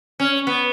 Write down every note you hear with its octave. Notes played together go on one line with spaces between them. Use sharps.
C#4
B3